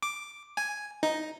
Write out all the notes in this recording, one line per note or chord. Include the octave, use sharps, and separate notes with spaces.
D6
G#5
D#4